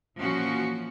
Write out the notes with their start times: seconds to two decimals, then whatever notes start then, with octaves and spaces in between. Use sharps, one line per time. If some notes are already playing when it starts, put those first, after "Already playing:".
0.20 A#2 E3 F3 C#4 F#4